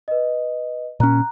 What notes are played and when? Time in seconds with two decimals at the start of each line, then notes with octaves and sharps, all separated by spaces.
0.08 B4 D#5
1.00 A#2 C#4 A#5 F#6